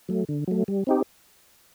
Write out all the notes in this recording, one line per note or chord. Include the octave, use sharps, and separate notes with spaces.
F#3 A3
D3
F#3 A3
G3
C4 D#4 G4